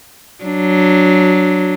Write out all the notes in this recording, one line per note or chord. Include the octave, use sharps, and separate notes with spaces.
F#3 D4